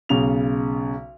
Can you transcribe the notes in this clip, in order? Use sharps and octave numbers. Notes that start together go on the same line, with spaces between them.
B1 C#3 F7